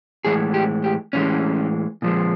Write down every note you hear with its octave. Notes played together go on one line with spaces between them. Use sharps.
A2 E3 G#3 G#4
G4
G4
A2 E3 G#3 C#4
A#2 F3 G#3